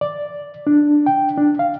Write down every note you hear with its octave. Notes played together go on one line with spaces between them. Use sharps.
D5
D4
G5
D4
F5